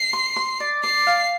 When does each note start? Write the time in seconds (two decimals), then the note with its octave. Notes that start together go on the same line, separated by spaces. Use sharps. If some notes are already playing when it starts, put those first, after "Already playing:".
Already playing: C7
0.13 C6
0.36 C6
0.60 D5
0.84 D5 C7
1.07 F5